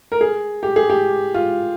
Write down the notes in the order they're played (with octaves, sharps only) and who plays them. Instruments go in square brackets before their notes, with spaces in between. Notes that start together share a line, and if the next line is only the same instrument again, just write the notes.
[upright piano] A#4
G#4
G4
G#4
G4
F4